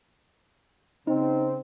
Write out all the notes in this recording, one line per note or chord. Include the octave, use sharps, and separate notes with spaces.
C#3 C4 D#4